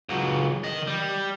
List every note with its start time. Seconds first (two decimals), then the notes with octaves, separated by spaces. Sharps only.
0.09 C#2 F#3
0.64 D#3 D#5
0.87 G3